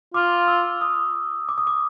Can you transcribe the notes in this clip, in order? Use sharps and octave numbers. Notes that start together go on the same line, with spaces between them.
F4 D6
E6
D#6
D6
D#6
D6